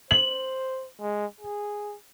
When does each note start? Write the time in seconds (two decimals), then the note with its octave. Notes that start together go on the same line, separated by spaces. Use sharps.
0.11 C5 F#7
1.00 G#3
1.41 G#4